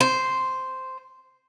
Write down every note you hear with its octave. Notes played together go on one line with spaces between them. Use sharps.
C5